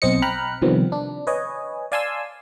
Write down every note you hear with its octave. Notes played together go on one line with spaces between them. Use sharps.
B1 C4 C5 D#5 C#7
G5 A#5 B5 F6 F#6
C3 D#3 F3 G3 B3 C4
D4
B4 C#5 D#5 G#5
D5 F5 G#5 A5 C6 E6